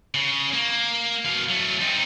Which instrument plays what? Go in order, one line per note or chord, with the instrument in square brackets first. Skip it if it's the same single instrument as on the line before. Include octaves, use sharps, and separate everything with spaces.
[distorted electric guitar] C#3
A#3
B2 F5
F#3 A3
C4 D#4